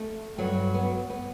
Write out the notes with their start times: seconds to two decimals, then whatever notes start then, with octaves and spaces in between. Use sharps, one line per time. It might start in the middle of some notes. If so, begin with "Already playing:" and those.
Already playing: A3
0.38 G2 F#3 A3
0.74 B3
1.10 B3